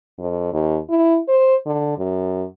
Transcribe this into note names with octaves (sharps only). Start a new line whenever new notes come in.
F2
D#2
E4
C5
D3
F#2